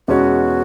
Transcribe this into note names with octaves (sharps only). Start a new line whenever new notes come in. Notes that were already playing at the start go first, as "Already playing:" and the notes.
E2 B2 G#3 C#4 F#4